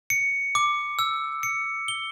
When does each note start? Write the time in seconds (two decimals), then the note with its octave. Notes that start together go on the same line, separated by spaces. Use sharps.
0.10 C#7
0.55 D6
0.99 E6
1.43 C#7
1.88 G7